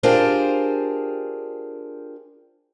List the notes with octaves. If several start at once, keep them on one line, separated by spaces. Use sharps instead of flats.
D4 F4 G4 G#4 A#4 C5